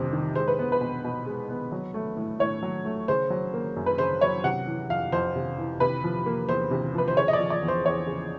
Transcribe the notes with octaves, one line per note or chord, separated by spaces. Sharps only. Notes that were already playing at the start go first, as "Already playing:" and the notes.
Already playing: F2 C3 G3 C5
D#3
G#3 C5
B4
B3
B4
B2
B2
G#3
B3
F#3
A3
A2
A2 C#5
F#3
A3
C#3 C5
F#3
A#3
F#2
B4
C#3 C5
F#3 C#5
C3 F#5
E3
F2 F5
F2 C5
C3
E3
C3 B4
F3
A#3
E2 C5
C3
F3 B4
C5
C#3 C#5
D#5
D5
F3
D5
E2
C5
E2 C#5
C#3